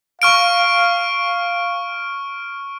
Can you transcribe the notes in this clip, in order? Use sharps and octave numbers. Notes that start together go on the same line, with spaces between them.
F5 C#6 F6 D7